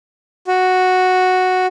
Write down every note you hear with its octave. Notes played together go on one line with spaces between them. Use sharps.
F#4